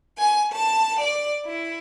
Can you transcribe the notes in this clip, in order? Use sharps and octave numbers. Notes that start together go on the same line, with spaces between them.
G#5
A5
D5
E4